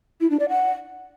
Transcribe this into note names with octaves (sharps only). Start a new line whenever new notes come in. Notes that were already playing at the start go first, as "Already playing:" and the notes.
E4
D4
D5
F#5